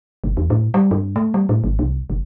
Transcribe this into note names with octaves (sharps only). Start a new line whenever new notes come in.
G1
E2
A2
G3
G2
A3
G3
A2
G#1
C2
F#1